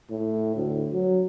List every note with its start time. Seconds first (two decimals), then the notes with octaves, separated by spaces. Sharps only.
0.10 A2
0.56 D2
0.93 F#3